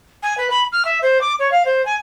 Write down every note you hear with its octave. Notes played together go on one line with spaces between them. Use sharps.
G#5
B4
B5
F6
E5
C5
D6
C#5
F5
C5
G#5